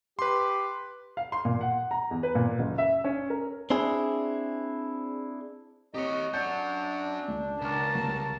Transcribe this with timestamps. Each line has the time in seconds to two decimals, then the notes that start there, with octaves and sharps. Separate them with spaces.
0.19 G4 B4 C6
1.17 F5
1.32 C6
1.45 A#2
1.61 F#5
1.91 A#5
2.11 E2
2.23 B4
2.35 A#2
2.59 F#1
2.78 E5
3.04 C#4
3.30 A#4
3.70 C4 D4 E4 G#4
5.94 C4 G4 C#5 D#5 A#5 C#6
6.34 C#4 D4 F#5 G6
7.28 C#2
7.61 C#2 A#4 A5 D6 F6
7.95 C2